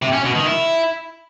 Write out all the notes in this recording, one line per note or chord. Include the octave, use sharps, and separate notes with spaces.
C3
C#4
B2
D#3
E4